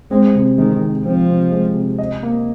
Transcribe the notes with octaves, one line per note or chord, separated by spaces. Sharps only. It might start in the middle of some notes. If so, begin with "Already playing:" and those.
G#3 C4
C3
D#3 G#3
C3
F3 C4
C3
G#3
C3
D#5
A#3